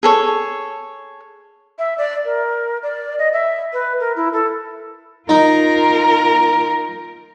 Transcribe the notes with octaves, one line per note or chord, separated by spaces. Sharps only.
G#4 A4 C#5
E5
D5
A#4
D5
D#5
E5
B4
A#4
E4
A4
D#4 F4 A#4